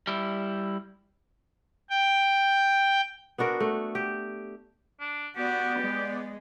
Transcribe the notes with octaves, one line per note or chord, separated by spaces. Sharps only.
G3 E4
G5
B3 D4 F#4 A#4
A3
G4
D4
B3 F#4 G4 D5
G#3